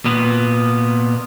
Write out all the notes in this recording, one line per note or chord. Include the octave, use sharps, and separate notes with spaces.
A#2 B3